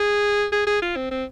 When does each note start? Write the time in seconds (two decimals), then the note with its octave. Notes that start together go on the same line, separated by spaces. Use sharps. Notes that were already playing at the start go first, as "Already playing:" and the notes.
Already playing: G#4
0.52 G#4
0.67 G#4
0.82 F4
0.96 C4
1.11 C4